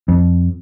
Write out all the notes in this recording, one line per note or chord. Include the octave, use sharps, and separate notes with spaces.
F2